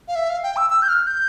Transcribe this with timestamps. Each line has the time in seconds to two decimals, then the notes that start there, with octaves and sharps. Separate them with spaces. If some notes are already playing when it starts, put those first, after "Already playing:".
0.08 F5
0.16 E5
0.30 F5
0.43 G5
0.57 E6
0.70 E6
0.82 G6
0.89 F6
1.07 G6